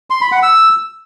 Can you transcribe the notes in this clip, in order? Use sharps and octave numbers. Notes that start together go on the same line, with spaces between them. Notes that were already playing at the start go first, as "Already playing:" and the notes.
C6
B5
F#5
E6